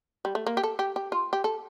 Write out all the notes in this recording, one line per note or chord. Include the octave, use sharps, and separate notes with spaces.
G3
A3
A#3
G4
A4
G4
G4
F4
G4
A4